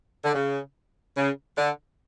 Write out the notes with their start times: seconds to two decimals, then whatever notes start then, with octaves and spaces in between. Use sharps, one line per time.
0.24 D3
0.34 C#3
1.17 C#3
1.57 D3